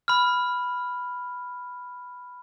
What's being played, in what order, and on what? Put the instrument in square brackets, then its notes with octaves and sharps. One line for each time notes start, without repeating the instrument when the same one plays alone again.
[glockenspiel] B5 F6